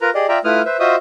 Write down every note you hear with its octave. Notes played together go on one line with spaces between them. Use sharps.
F4 A#4 B4 A#5
G4 G#4 D5 D#5
F4 D5 E5 G5 A#5
A3 E4 F4 B4 D#6 F6
B4 C5 E5
F4 F#4 C5 D#5 E5 D#6